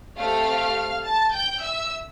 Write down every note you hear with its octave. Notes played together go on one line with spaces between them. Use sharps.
A3 C4 G4 F5 F6
A5 A6
G5 G6
E5 E6